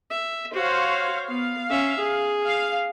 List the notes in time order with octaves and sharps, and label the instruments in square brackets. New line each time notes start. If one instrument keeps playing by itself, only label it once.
[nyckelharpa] E5
[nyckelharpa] F#4 [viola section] C5 C#5 F5
[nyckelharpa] B3 [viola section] F5
[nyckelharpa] C#4 E5
G#4
[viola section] F5